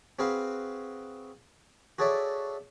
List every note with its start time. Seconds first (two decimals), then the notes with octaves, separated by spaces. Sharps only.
0.19 C4 F#4 G#4 B4 F5
1.98 F#4 G#4 A4 C#5 D5 E5